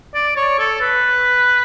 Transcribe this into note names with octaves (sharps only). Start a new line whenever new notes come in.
D5
C#5
A4
B4